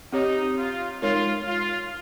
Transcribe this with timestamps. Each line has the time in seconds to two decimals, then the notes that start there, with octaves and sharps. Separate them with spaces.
0.13 C4 D#4 G4 C#5
0.57 F4
1.02 G#3 D#4 F4 A#4 C#5
1.47 F4